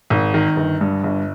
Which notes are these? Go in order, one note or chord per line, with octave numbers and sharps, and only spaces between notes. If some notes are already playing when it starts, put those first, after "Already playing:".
G#1
D#3
G1
G2
G1